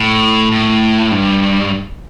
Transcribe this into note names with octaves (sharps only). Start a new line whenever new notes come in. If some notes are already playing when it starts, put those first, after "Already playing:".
Already playing: A2
A2
G2